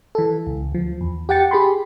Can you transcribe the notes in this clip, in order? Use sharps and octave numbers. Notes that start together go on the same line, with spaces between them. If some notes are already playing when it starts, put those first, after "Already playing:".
E3 A4
C#2
D2 F3
E2
G4 F#5 G5 A6 C#7
G4 G#4 B5 C6